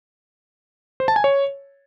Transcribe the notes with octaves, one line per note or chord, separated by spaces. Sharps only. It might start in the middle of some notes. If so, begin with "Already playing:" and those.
C5
A5
G#5
C#5